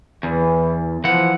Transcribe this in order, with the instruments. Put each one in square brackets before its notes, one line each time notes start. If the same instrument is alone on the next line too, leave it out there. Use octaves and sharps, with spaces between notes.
[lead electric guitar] E2 [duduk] E3
[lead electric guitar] E3 F#5 [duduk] F3